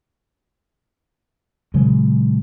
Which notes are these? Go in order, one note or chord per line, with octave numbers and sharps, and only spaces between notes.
A#2 C#3 F#3 G#3